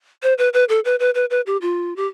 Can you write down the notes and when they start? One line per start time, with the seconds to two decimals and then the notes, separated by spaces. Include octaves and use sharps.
0.23 C5
0.38 B4
0.54 B4
0.69 A4
0.85 B4
1.00 B4
1.15 B4
1.30 B4
1.46 G4
1.62 F4
1.96 G4